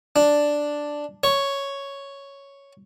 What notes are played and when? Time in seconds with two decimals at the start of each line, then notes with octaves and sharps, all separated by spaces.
0.16 D4
1.24 C#5